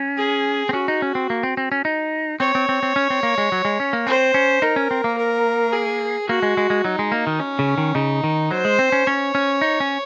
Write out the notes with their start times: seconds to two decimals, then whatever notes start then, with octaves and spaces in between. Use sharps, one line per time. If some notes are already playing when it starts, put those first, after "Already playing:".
Already playing: C#4
0.18 G#4
0.69 C4
0.73 C#4 F#4
0.88 D#4
1.02 C#4
1.15 C4
1.30 A#3
1.43 C4
1.57 C4
1.72 C#4
1.85 D#4
2.40 C4 C#5
2.55 C4
2.69 C4
2.83 C4
2.96 C#4
3.10 C4
3.23 A#3
3.38 G#3
3.52 F#3
3.65 G#3
3.80 C#4
3.93 A#3
4.07 C4 C5
4.34 C#4
4.62 D#4 A#4
4.76 C#4
4.91 C4
5.04 A#3
5.18 A#4
5.73 G#4
6.29 A#3 F#4
6.42 G#3
6.57 G#3
6.70 G#3
6.84 F#3 D#4
6.99 G#3
7.12 A#3
7.27 D#3
7.40 C#4
7.59 C#3
7.78 D#3
7.95 C#3 D#4
8.24 D#3
8.51 F#3 C5
8.65 G#3
8.79 C4
8.92 C#4
9.07 C#4 C#5
9.35 C#4
9.61 D#4
9.80 C#4